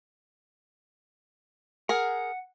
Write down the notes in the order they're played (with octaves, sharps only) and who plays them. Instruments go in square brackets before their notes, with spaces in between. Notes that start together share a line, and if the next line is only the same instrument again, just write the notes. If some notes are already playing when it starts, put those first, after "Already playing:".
[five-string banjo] G#4 A#4 [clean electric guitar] F#5